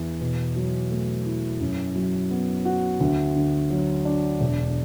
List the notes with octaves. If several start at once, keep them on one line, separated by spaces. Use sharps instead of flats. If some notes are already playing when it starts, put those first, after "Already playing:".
Already playing: E2
B2
F#3
A3
E4
F#2
F#3
B3
F#4
D2
D3
F#3
D4
E1